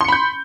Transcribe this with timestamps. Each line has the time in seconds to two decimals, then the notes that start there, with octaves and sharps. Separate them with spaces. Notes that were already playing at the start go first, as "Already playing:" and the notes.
0.01 C6
0.05 C#7
0.08 B5
0.12 G6